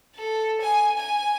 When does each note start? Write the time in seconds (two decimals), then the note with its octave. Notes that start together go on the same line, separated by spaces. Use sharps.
0.16 A4
0.61 G#5
0.98 G#5